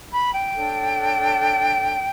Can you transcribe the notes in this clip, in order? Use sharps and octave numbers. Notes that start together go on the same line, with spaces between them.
B5
G5
D4 A4 C#5